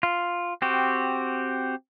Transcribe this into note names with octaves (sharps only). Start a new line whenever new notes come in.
F4
C4 F#4 G4